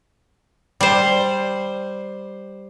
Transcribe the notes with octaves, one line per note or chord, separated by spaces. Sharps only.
G3 C5